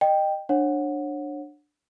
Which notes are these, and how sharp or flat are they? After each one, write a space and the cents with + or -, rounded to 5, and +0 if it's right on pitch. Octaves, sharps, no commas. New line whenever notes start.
D#5 -25 G5 +0
D4 +10 C#5 -25 F#5 -20